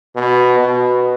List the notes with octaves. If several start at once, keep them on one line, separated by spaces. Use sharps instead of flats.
B2
B2